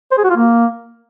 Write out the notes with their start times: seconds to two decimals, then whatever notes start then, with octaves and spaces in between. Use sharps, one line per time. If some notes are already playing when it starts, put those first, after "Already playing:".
0.12 C5
0.18 G#4
0.24 F#4
0.30 F4
0.36 A#3